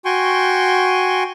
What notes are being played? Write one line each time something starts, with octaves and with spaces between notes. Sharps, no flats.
F#4 G5 G#5 C6 C#6